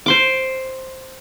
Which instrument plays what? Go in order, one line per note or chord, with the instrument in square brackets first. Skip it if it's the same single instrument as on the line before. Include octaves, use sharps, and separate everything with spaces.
[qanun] C5 C6 D6